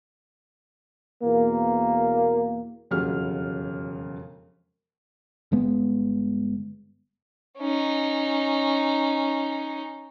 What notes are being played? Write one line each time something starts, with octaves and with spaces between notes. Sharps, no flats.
E2 B2 A#3
E1 F2 C#3 F#3 G4 F6
G1 G#3 B3
C#4 D#4